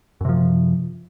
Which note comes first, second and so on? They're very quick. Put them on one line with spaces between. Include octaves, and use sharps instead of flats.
F#2 C3 F3